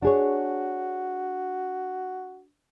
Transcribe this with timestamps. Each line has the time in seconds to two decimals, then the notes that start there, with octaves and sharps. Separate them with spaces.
0.02 D4 F#4 G#4 C#5